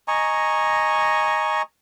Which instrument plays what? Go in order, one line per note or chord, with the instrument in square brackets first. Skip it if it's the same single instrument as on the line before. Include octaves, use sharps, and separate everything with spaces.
[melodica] D#5 G#5 A#5 C#6